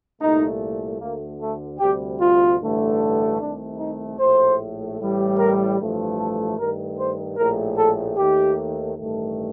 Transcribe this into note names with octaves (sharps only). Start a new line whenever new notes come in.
C2 A#2 A3 D#4
D2 D3 A3 A#3
A3
D2 C3 G3 G4
F4
A1 G2 D3 A3
C2 C3 D#3 A3 D4
D#4
A#1 A2 A3 C5
A1 A2 G3
A#4
A1 G2 F3 A3
A4
G2 D#3 A3 A#4
C5
A#1 A2 A3 A#4
A4
D#2 D#3 A3 G4
A1 G2 D#3 A3